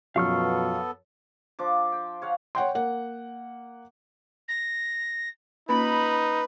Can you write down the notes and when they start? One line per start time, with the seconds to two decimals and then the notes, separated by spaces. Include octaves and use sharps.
0.16 F#2 B2 F3 B3 A4 F5 C#6 F6
1.59 F3 D4 D6
1.92 G5
2.22 C#5 F5 F#5
2.55 C#5 F#5 G5 C6
2.75 A#3 F#5
4.48 A#6
5.69 A#3 C#4 D#4 F4 B4 B5